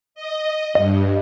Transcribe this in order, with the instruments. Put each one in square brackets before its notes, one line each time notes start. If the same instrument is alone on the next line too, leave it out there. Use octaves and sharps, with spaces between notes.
[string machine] D#5
[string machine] G2 [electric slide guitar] D#5